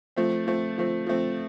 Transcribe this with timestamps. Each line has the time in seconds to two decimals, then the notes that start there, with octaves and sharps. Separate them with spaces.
0.16 F3 A3 C4
0.47 F3 A3 C4
0.78 F3 A3 C4
1.07 F3 A3 C4